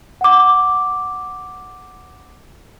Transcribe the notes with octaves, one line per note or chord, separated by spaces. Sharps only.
F#5 D6